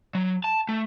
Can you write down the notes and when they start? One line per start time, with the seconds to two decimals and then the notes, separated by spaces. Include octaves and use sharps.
0.15 F#3
0.44 A5
0.69 A3